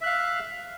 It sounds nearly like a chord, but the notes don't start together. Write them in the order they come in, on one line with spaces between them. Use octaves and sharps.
E5 F#6 F5